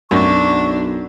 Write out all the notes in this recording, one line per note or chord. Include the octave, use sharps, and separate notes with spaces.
B1 F#2 D4 C#6